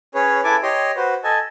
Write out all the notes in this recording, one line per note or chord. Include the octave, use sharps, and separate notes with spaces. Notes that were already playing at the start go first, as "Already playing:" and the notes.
C#4 G#4 B4 C#5
E4 A4 B4 G#5 A5 D6
G4 C#5 D#5 C6
F#4 B4 C5
A4 D#5 G#5 A5